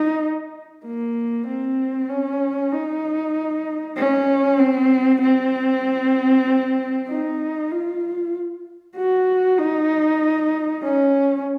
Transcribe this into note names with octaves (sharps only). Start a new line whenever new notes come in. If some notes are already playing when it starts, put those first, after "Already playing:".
Already playing: D#4
A#3
C4
C#4
D#4
C#4
C4
C4
D#4
F4
F#4
D#4
C#4